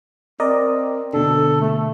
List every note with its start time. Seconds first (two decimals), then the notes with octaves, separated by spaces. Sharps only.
0.40 C4 A#4 D5 D#5
1.13 B2 D3 A4
1.61 A3